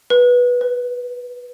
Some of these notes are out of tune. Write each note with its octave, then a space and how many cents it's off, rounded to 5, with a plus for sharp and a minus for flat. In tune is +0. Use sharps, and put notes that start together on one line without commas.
B4 -10
B4 +40